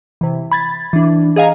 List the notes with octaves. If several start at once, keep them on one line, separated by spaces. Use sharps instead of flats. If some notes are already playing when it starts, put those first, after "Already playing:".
C3 E3
B5 G#6 A6
E3 D4
G#4 D#5 F5 G#5 A#5